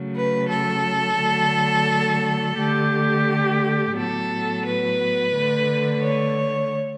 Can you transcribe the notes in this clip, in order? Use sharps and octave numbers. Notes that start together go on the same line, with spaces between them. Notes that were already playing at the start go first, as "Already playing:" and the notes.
Already playing: C#3 F#3 A3
B4
A4
D3 F#3 A3
D3 A3 G4
A2 F#3 B3 A4
B4
D3 A3
C#5